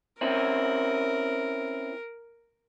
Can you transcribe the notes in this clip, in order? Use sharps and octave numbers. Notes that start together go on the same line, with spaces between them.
C4 C#4 E4 A#4